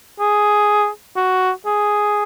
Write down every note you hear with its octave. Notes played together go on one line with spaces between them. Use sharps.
G#4
F#4
G#4